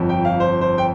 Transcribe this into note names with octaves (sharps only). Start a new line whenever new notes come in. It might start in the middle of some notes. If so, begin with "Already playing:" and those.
Already playing: G1 F2 F3
G5
F5
C5
C5
G5